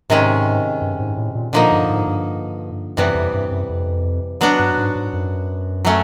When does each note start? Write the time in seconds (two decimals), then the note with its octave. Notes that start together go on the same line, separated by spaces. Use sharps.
0.09 G#2 C3 D#3 G#3 C#4
0.82 G2
1.00 G#2
1.17 A2
1.35 A#2
1.53 A#2 D3 F3 A#3 D#4
1.72 G2
1.90 G#2
2.07 G2
2.97 F#2 C3 E3 G3 B3
3.15 F2
3.34 G2
3.51 F#2
3.69 F2
4.41 F#3 B3 D4 F#4
4.59 G2
4.78 G#2
4.95 G#2
5.13 F#2
5.85 F#3 A3 C#4